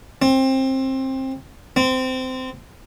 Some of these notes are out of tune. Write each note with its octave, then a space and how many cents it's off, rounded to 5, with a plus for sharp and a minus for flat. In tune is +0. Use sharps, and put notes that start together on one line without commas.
C4 +20
C4 -20